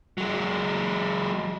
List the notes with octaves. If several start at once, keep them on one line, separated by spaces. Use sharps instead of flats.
F#3 G#3